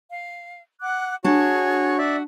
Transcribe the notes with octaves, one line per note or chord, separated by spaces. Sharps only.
F5
F#5 D6 F#6
D4 F#4 G#4 C#5 A5 G#6
F#4 D5 E5